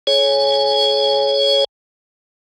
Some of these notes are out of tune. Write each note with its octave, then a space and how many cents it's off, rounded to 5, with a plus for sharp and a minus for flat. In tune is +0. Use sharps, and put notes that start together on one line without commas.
G#4 +35 C#5 +0 G#5 +0